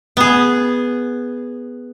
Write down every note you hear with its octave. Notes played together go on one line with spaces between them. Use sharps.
B3 G#4